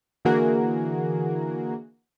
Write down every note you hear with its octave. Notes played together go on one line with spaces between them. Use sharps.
D3 E3 A#3 F#4 G#4 A#4